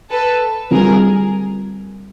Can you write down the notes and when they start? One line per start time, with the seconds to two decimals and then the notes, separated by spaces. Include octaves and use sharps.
0.10 A4 B4
0.71 D3 G3 C4 F4 G#4 A#4